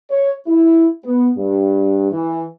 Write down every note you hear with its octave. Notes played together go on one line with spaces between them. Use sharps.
C#5
E4
B3
G2
E3